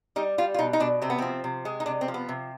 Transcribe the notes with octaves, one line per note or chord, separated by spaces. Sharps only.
G3 D#4
G3 F4
F4
B2 D#4
D#4
B2 D4
C3 C4
B3
F3 C4
C3
G#3
D#4
C3 D4
C4
F3
B3
C3